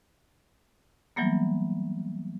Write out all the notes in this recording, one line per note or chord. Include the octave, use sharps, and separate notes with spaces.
E3 F#3 G3 A#3 B3